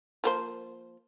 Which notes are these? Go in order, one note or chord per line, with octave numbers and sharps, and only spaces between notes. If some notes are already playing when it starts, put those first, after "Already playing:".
F3 A#3 C5